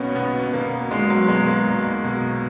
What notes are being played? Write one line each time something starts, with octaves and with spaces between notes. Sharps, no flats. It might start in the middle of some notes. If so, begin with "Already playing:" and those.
Already playing: B1 B2 A#3 B3 C#4
B1 B3
B2 A#3
B1 G#3
F#3
B2 G#3
A#3
B1
B2